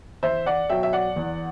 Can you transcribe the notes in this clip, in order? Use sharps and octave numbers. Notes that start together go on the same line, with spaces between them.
E2 C5 E5
D5 F#5
B2 F#3 E5 G5
E5
D5 F#5
E2